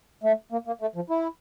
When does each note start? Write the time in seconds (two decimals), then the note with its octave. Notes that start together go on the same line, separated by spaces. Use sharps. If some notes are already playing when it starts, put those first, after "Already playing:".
0.23 A3
0.52 A#3
0.67 A#3
0.81 A3
0.95 F3
1.10 E4